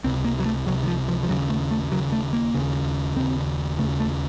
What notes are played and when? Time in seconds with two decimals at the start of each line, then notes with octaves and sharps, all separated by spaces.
0.04 C#2 C3 C4
0.24 A#3
0.39 F#3
0.46 A3
0.66 C#2 C3 F#3
0.83 D#3
0.87 F3
1.08 F3
1.23 F3
1.29 D#2 C#3 F#3
1.50 A3
1.71 A3
1.92 D#2 C#3 F#3
2.12 A3
2.33 A#3
2.54 D#2 C#3
3.16 D#2 C#3 C4
3.79 C#3 A3
3.82 D#2
4.00 A3